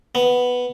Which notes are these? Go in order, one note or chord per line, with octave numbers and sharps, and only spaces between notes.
B3